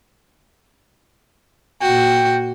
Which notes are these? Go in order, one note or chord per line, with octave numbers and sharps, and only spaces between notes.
A#2 F#4 G5